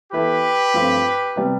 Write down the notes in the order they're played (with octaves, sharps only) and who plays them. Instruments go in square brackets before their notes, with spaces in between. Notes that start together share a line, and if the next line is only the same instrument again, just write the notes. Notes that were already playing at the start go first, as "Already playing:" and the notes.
[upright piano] E3 B3 E4 A4 [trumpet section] G4 B4
[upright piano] G2 F3 A3 C4
C3 G3 B3